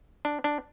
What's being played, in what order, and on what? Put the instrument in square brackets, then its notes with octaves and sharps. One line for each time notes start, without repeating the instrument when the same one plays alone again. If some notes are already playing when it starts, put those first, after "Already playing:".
[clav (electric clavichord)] D4
D4